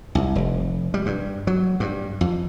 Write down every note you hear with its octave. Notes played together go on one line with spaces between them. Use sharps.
C2
F1
G3
G2
F#3
G2
F2